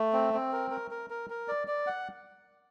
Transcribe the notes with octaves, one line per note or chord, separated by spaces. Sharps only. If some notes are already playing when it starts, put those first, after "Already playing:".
Already playing: A3
C4
C4
A#4
A#4
A#4
A#4
A#4
D5
D5
F#5